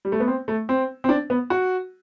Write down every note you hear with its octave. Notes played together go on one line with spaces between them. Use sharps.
G3
A3
B3
C4
A3
C4
C4
D4
B3
F#4